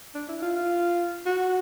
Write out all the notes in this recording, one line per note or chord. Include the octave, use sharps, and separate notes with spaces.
D4
E4
F4
F4
F#4